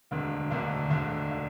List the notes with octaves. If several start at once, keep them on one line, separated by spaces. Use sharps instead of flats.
E1 D2 D3
E1 D2 D3
E1 D2 D3
D3